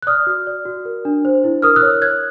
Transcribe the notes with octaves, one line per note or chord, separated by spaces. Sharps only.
F#6
D5 D#6 F6
F#4
D5
F#4
A#4
D4
C5
E4
A#4 D#6 F6
E6 F#6
C#5
C#5 F#6 G#6